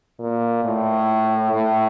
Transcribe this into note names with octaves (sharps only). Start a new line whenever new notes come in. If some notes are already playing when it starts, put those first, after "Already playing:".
A#2
A2
A2